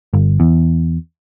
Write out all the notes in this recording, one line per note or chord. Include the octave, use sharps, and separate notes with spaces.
G1
E2